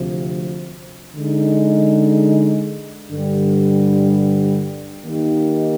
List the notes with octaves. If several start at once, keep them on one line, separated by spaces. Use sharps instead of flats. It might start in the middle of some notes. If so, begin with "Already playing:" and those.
Already playing: D2 C3 F3
D3 G#3 D#4
G2 D3 G3
D#3 A#3 D#4 G4